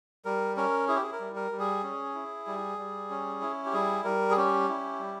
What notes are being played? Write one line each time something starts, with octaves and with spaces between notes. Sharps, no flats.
G3 A#4
C#4 A#4
E4 G#4
G4
G#4
A#4
G3
A#4
G3
G#4
C#4
E4
G3
G3
C#4
E4
G4
G3 G#4
G3 A#4
G#4
C#4 G4
E4
G3